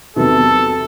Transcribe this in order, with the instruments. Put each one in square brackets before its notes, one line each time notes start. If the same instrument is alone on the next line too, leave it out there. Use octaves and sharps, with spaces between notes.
[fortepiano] E2 C3 D#3 F#3 B3 [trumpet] A4